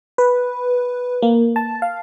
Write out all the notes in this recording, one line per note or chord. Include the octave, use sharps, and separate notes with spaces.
B4
A#3
A5
F5